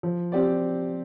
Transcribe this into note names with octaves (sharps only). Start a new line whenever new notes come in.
F3
C4 G4 D5